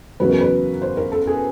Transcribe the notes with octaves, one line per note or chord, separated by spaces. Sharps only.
E2 C#3 F#3 B3 B4
A#4
B4
C5
A#4
A4
G#4